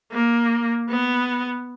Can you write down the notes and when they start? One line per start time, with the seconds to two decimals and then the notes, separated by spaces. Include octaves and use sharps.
0.12 A#3
0.89 B3